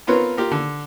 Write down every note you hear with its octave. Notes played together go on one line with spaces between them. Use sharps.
B3 C4 F4 A#4 B4 C#5
F4 G4 A#4
D3